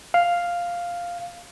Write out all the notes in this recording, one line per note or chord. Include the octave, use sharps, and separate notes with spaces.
F5